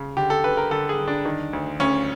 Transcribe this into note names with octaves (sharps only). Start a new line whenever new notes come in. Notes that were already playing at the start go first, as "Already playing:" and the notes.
Already playing: C#3
D3 G4
A4
D3 B4
A#4
D3 A4
G#4
D3
D4
D#3
D2
D2 C#4